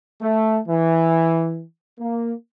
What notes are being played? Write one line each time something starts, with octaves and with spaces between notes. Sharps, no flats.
A3
E3
A#3